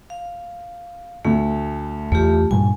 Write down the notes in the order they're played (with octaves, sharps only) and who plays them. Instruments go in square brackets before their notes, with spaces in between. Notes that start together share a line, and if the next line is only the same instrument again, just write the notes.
[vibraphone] F5
[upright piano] D2 [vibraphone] A3
[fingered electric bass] E2 [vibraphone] A3 F4 G4
[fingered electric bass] G2 A#2 G3 [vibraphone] G#5